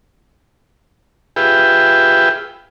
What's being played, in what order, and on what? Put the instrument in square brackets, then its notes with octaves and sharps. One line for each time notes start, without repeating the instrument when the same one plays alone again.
[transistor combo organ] F4 G4 G#4 B4 E5 G5